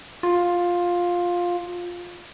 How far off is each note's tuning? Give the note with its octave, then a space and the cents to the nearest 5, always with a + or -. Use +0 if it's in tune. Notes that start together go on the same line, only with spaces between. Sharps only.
F4 +10